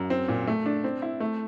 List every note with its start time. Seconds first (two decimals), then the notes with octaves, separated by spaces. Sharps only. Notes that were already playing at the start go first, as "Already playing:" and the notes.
Already playing: F#2
0.10 C4
0.28 A#2
0.47 A3
0.66 D4
0.84 C4
1.02 E4
1.20 A3